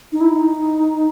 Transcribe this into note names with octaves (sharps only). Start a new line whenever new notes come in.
D#4
E4
D#4